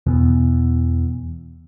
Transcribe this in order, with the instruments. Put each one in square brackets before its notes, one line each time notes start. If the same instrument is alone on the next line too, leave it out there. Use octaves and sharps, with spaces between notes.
[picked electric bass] E2 [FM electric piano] B2